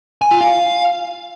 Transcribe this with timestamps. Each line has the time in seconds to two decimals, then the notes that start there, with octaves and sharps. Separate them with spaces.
0.22 G#5
0.31 F4
0.41 F5